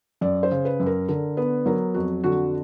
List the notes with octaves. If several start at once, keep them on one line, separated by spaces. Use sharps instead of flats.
F#2 D5
C5
C#3
B4
F#2
A#4
D3 A#4
B3 B4
F#3 A#4
F2 F#4
D3 F#4